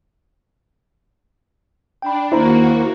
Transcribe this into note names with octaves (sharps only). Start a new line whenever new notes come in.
D4 G5 B5
D#2 A#3 E4 F#4 C5 A#5